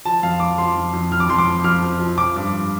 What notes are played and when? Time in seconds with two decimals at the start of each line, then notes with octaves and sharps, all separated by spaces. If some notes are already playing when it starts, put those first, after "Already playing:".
0.05 F3 A5
0.23 F2 F5
0.40 F2 D6
0.58 F3 C6
0.76 F2
0.93 F2
1.11 F2 F6
1.20 D6
1.29 F2 C6
1.38 D6
1.46 F3
1.64 F2 F6
1.83 F3
2.00 F3
2.18 F3 D6
2.36 G2
2.53 F3